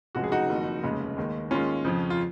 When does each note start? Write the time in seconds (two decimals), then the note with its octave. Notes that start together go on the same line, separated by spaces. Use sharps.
0.15 F1 F2 C#3 G#3 F#4
0.24 G#4
0.32 D#4 F#4
0.49 F#1 F2 D#3
0.83 F1 D#2 C#3 G#3
1.17 D#2 D#3 G#3
1.51 D#2 D#3 G#3 C#4 F4
1.85 F2 C#3 F3
2.10 F4